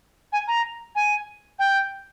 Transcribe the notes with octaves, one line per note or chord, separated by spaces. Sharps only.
G#5
A#5
G#5
G5